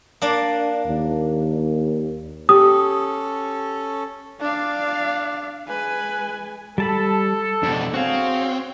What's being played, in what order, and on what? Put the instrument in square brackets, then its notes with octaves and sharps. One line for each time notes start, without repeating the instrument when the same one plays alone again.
[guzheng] A#3 D4
[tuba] D#2
[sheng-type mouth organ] C#4 A4 [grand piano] G4 [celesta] D#6
[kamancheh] D4 [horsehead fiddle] D5 F5
[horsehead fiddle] G#3 G#5 [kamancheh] B4
[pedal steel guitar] G3 A5 B5 [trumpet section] A4
[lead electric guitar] F2 B2 [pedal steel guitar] D4
[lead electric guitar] C4 [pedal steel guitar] F#4 F5 [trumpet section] G#4 C#5